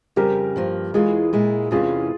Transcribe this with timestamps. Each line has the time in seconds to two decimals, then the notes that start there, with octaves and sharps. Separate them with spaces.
0.16 F2 C#3 G3 G4 A#4
0.56 G2 F3 A#3
0.94 E2 E3 G#3 F4 G#4
1.33 A#2 G#3 E4
1.71 E2 C3 E3 G#3 C#4 F4 G#4